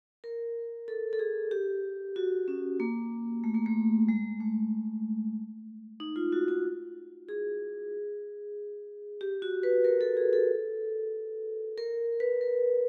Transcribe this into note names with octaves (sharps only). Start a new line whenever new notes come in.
A#4
A4
A4
G#4
G4
F#4
C#4
A#3
A3
A#3
A3
G#3
A3
D#4
F4
F#4
F#4
G#4
G4
F#4
B4
A#4
A4
G#4
A4
A#4
B4
A#4